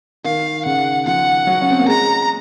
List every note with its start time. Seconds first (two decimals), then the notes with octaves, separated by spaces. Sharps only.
0.24 D#3 F5
0.65 C#3 F#5
1.06 F3 F#5
1.47 F#3
1.61 C#4
1.70 C4
1.79 A#3
1.87 G#3 A#5